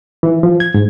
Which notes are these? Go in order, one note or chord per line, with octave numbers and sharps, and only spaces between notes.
E3
F3
G#6
G#2